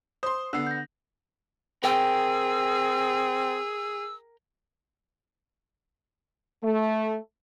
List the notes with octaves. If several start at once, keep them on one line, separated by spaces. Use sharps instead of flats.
C5 C6 D#6
D3 B3 E6 C7
G6 A#6
C4 G#4 A#4 G5 E6
A3